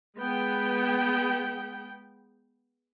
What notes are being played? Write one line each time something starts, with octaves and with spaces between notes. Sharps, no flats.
G#3 B3 G5